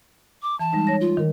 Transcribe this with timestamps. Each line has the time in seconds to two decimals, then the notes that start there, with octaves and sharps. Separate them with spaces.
0.42 D6
0.60 E3 A5
0.73 G3 G#3 D#4
0.87 C#5 A#6
1.01 F4
1.17 D#3 A#4